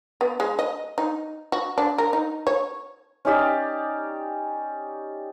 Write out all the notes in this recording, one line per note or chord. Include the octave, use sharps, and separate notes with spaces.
B3
G#3
D#5
D#4
F#4
D4
A#4
D#4
C#5
C#4 D#4 G4 D5